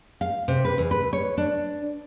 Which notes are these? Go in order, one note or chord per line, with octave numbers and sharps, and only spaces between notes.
F5
C3
B4
E2
B4
C#5
D4